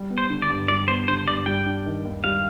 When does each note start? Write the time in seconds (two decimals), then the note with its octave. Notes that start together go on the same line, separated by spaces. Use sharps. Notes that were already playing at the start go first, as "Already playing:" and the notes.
Already playing: G3
0.10 B3
0.18 C5
0.30 D3
0.42 D5
0.49 G2
0.68 G3 D5
0.88 B3 C5
1.08 D3 C5
1.27 G2 D5
1.46 G3 G5
1.66 D4
1.86 D#3
2.05 D#2
2.24 G3 F5